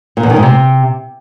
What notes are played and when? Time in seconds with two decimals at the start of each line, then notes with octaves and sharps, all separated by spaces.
0.17 A#2
0.23 E2
0.30 D#3
0.36 G#2
0.43 C3